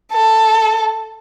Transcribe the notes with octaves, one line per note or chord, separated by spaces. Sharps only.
A4